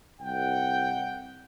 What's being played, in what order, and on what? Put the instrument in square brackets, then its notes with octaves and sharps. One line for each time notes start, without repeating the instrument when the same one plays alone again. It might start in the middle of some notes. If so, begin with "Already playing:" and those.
[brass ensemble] C2 F#5 G5